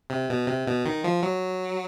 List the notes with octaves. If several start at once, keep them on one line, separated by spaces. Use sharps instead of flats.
C3
B2
C3
B2
D#3
F3
F#3